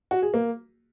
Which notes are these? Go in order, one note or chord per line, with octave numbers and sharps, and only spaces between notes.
F#4
G#4
A#3